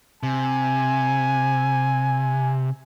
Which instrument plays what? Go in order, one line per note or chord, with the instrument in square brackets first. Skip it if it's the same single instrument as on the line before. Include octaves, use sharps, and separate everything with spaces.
[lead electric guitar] C3 [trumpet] G#5